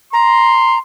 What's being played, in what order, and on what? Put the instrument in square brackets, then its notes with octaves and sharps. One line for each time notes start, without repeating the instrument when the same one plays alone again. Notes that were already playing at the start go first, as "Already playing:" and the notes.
[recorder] A#5 [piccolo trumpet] C6